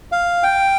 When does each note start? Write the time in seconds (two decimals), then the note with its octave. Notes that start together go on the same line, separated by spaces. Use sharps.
0.12 F5
0.43 G5